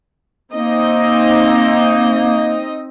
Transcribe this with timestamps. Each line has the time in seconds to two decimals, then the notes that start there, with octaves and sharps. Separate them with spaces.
0.52 A#3 C4 D#4 D#5